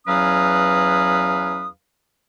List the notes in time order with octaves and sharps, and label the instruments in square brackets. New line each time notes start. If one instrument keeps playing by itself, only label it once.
[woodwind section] E2 F#3 C#4 B4 F5 D#6